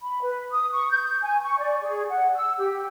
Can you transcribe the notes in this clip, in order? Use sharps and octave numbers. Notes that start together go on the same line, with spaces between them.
B5
B4
D#6
C#6
G6
G#5
C#6
D5
G#4
F#5
E6
G4